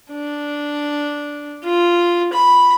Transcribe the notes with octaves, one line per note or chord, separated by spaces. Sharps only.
D4
F4
B5